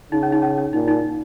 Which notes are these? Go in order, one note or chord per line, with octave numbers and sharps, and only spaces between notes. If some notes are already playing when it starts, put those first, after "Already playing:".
C#3 D#4
C#4
D#4
C#4
C#4
A#2 D#4
D#4